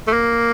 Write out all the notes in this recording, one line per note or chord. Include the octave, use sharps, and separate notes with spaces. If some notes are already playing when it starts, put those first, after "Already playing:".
A3
A#3